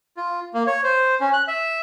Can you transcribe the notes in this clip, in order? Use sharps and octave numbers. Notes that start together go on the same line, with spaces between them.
F4
A#3
C#5
C5
C#4
F#6
E5